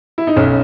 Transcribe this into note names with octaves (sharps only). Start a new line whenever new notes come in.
E4
D#4
B1 C#4